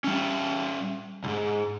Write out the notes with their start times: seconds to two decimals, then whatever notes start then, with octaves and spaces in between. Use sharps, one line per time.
0.04 G3 C#4
1.24 C2 G#2